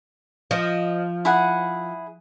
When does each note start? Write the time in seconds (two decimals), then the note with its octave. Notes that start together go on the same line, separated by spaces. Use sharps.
0.51 F3 D#5
1.25 E4 G#4 F#5